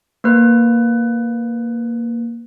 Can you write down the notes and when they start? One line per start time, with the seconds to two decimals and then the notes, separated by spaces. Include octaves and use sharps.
0.24 A#3 B4